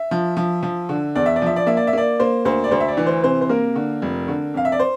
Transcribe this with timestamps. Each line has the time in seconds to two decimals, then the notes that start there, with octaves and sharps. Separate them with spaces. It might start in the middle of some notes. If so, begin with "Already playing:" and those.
Already playing: E5
0.11 F3
0.37 F3
0.63 F3
0.89 D3
1.16 E2 D5
1.26 E5
1.36 D5
1.42 F3 E5
1.56 D5
1.66 A#3 E5
1.77 D5
1.87 E5
1.93 A#3 D5
2.20 A#3 C5
2.45 D2 C5
2.64 D5
2.71 D2 C5
2.80 E5
2.88 D5
2.97 E3
3.06 C5
3.24 C3 C5
3.41 C5
3.49 A#3 A#4
3.76 D3
4.02 F1
4.28 D3
4.54 F2 F5
4.65 E5
4.72 D5
4.79 C5